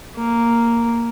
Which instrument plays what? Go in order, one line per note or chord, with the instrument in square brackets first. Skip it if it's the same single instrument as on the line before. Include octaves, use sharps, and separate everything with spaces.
[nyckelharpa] A#3